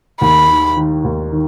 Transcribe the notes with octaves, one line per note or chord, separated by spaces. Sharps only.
D#2 B5
D#3
D#3
D#2
D#3